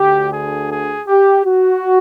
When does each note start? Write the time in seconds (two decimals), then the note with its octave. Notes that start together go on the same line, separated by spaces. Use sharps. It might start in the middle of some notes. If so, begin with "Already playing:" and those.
Already playing: D2 D3 G4
0.31 G#4
0.69 G#4
1.08 G4
1.45 F#4